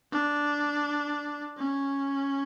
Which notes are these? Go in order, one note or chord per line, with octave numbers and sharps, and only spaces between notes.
D4
C#4